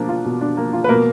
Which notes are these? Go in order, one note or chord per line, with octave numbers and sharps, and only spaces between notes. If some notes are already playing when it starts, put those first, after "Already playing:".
Already playing: B2 F3 A#3 D4
F4
B2
D4
A#3
F4
B4
B2 A#3 A#4